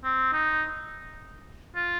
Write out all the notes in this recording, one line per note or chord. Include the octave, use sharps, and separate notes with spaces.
C4
D#4
F4